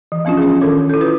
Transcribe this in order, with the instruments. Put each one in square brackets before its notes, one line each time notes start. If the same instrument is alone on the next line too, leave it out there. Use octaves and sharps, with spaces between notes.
[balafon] E3
F3 B3 C#4 D4 F4
C#4 F4 G#4
D#3 C#4 A4 A#4
E4 A4
F4 B4